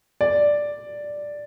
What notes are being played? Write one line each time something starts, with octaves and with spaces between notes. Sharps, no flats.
D5